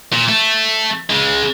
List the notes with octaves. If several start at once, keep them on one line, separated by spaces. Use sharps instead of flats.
A#2
A3
C#3 G#3